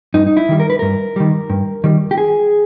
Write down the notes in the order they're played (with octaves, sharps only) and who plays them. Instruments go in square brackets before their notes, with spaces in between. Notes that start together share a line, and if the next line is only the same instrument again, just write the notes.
[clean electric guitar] G2 D#4
D#4
E4
D#3 G3
A#4
B4
G2 A#4
D#3 G3
G2
D#3 G3
G4
G#4